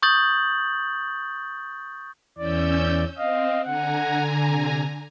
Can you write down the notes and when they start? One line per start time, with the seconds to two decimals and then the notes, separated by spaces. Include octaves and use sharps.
0.02 C#6 D#6 G6 A6 F#7
2.38 E2 E3 C#4 D5 E6 G6
3.18 C4 D#5 F5
3.65 D3 F#5 G#5 A#5
4.47 C3